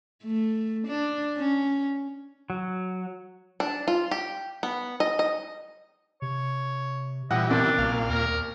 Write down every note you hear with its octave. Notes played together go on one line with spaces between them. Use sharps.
A3
D4
C#4
F#3
D4
F4
G4
B3
D#5
D#5
C3 C#5
A#2 E3 G3 D#5 F#5
C2 B2 D4
B1 A#2 F5
D#2 A#4